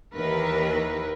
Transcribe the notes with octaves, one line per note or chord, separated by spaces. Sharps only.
D#2 D#3 E3 A#4 B4